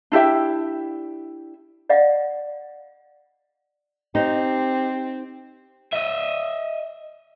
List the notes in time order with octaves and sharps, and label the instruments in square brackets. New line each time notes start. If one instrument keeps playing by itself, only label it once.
[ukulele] D4 E4 G4 E5
[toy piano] D5 D#5 F5 F#5
[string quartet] C4 [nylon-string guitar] D#4 [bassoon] G4
[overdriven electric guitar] D#5 E5